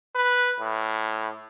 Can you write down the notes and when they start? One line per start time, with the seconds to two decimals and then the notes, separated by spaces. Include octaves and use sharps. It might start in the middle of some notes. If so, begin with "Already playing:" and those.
0.15 B4
0.60 A2